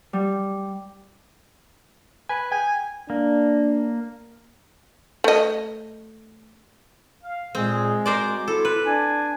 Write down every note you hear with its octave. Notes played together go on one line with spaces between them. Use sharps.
G3
B4 G#5
G5 G#5
A#3 D4
A3 D#5
F5
A#2 G#3 C4 G#4
F#4 A#4 C5 D5 C6 D6
E4 A4
B4
D4 G#5